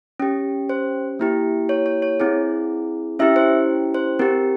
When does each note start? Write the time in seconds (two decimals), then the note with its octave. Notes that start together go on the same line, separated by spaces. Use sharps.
0.20 C#4 G4
0.69 C5
1.19 A#3 E4 G4
1.69 C#5
1.86 C#5
2.02 C#5
2.20 C4 E4 G#4
3.19 C#4 E4 G4 E5
3.36 C5
3.94 C5
4.19 C4 G4 A#4